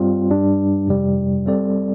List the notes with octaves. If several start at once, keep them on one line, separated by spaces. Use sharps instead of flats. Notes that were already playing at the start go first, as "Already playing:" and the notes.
Already playing: G2 G3 C4 F4
G2 G3 D4
F2 C3 G3
G3 C4 A4 D5